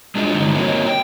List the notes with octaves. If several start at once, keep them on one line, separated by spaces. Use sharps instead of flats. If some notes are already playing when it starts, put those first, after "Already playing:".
G#3 D4 F4 F#4 G#4 D#5
G2 D3 F#3 G#3 C4 D#4
A#3 C4 F#4 A#4 C#5 D#5
G5